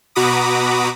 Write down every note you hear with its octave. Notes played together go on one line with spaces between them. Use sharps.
B2 F#4 A#5 B5 D6 D#6